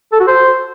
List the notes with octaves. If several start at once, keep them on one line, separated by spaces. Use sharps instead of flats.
A4
F#4
C5